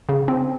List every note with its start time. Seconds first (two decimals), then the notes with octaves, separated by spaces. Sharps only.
0.09 C#3
0.28 C4